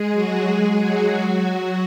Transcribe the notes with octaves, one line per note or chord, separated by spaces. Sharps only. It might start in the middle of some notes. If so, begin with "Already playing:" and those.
Already playing: G#3 G#4
F#3 F#4
G#3 G#4
F#3 F#4
F#3 F#4